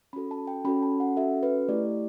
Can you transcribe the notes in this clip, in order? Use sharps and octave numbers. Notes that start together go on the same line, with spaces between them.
C#4 F#4 A4 B5
A5
G5
C#4 F#4 A4 B5
A5
F#5
C#4 F#4 A4 E5
B4
A3 E4 G4 D5